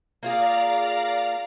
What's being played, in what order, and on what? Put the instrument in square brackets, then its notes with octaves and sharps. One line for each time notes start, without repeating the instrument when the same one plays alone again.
[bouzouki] A#3 F4 G#4 [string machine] D5 F5 A#5